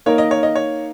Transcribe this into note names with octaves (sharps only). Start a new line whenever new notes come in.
A#3 D#4 A#4 C#5
D#5
C#5
D#5
C#5